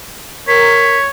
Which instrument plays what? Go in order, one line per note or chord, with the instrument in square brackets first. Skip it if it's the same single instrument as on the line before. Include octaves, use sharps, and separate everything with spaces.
[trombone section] A#4 [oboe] C#5 [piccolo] B6